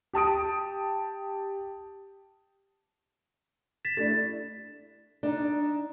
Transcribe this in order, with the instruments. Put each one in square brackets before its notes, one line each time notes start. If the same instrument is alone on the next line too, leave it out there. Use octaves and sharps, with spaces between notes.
[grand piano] G4 A5 D#6 D7
[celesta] A6 B6 E7
[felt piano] A3 D4 E4 [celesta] A6
[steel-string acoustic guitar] D4 D#4